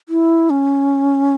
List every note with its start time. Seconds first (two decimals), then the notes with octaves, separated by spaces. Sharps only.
0.09 E4
0.50 C#4